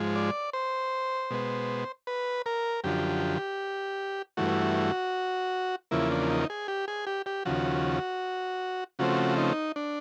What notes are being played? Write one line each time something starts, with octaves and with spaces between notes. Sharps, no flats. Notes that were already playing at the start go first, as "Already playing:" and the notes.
Already playing: G#2 F3 G#3
D5
C5
B2 G#3 B3
B4
A#4
F#2 D3 F3 G4
G2 E3 A3 F#4
E2 C#3 F3 A#3 E4
D4
D#4
G#4
G4
G#4
G4
G4
D#2 C#3 F3 F#4
C#3 F3 A3 C4 F#4
D#4
D4